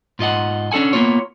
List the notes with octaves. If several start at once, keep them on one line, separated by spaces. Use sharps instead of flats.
G#2 F4 D#5 F#5
C#4 D4 A4 F#5 G#5
A#3 B3 F4 C#5